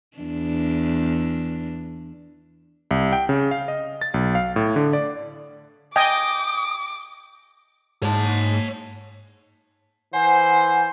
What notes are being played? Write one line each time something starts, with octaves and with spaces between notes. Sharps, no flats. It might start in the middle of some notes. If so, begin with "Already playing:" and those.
E2 D4
C2
G5
C#3
F5
D#5
A6
B1
F5
A2
D3
D5
D#5 G5 G#5 D6 D#6
G#2 C#5 A5
E3 C5 F#5 G#5